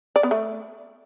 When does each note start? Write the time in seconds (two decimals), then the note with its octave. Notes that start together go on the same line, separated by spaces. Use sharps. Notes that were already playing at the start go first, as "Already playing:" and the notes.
0.16 D5
0.23 B3
0.31 A3